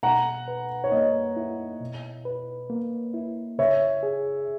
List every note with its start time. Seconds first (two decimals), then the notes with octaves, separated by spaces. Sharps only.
0.03 B2 F#5 A#5
0.48 B4
0.84 C#5
0.91 A#3 D#5
1.36 E4
1.81 B2
2.25 B4
2.70 A#3
3.14 E4
3.58 C#3 C#5 E5
4.03 G#4